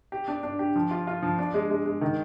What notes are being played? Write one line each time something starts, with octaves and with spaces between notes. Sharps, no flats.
G4
D4
D4
G4
F3
F4
F4
F3
D4
G#3
G#3
G#3
D#3